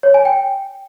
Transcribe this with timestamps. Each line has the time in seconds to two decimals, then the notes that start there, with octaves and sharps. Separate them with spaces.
0.03 C#5
0.14 G#5
0.25 G5